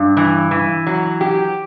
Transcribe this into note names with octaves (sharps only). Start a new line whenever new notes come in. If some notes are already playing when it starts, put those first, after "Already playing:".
Already playing: G2
E3
E3
F#3
G4